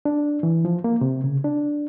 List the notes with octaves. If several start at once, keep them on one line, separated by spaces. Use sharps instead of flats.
D4
E3
F3
A#3
C3
C#3
D4